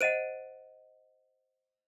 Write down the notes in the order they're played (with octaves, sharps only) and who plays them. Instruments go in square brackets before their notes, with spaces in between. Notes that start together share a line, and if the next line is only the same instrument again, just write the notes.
[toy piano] C5 D#5 F#5 [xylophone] D7 D#7